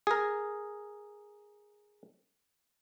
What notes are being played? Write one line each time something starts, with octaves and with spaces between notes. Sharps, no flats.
G#4 A#4